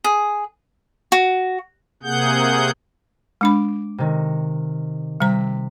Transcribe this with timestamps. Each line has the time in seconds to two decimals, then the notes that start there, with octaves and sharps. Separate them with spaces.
0.04 G#4
1.12 F#4
2.03 C3 A#3 G#4 F#5 G6
3.41 G#3 D4 B5 D6
3.98 C3 D#3
5.20 C3 G3 A#5 B6